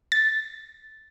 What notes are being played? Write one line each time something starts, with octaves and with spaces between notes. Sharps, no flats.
A6